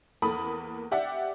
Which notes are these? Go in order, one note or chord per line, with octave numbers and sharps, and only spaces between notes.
E2 A#3 A4 B5 D#6
G4 D5 E5 F#5